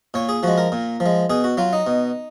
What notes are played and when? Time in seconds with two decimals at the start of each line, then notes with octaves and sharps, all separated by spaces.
0.14 A#2 C#5
0.29 G#4
0.43 F3 G#3 F#4
0.58 A#4
0.72 A#2
1.00 F3
1.06 G#3
1.30 B2 G#4
1.44 F#4
1.57 F#3 F4
1.73 D#4
1.87 B2